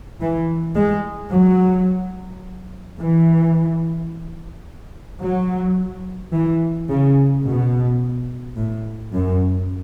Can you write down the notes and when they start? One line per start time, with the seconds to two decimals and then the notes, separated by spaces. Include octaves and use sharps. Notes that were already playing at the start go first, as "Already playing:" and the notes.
0.20 E3
0.75 G#3
1.32 F#3
2.98 E3
5.22 F#3
6.34 E3
6.89 C#3
7.45 B2
8.57 A2
9.12 F#2